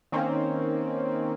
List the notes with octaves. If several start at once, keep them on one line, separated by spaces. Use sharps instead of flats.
D#3 A#3 C4 C#4